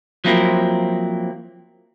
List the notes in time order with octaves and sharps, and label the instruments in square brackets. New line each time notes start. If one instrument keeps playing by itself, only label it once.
[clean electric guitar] F3 F#3 A#3 C4 E4